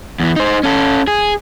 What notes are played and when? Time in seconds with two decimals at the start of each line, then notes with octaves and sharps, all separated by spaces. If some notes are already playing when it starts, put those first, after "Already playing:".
0.20 E2 E3
0.36 D#4 C5
0.63 C#4 A4
1.07 G#4